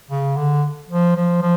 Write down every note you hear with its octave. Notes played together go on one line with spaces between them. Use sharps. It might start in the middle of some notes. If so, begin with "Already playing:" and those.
C#3
D3
F3
F3
F3